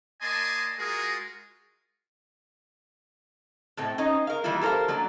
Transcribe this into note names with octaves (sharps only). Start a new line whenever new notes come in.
A#3 D5 D#5 G#5 A5 C6
G#3 F4 F#4 G#4 A#4
A2 A3 C4
C#4 D#4 C5 D#5
A#4 F5
D#3 E3 G3 A#3 E4 F4
G4 A4 A#4 C5 F5
F#3 A#3 D4 D5